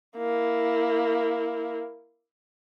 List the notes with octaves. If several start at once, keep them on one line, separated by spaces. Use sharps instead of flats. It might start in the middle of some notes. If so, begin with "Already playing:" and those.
A#3 E4